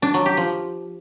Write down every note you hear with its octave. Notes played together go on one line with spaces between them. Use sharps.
D4
F#3
G4
F3